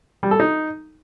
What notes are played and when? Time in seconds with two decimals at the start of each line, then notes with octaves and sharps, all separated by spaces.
0.23 G3
0.31 A4
0.40 D#4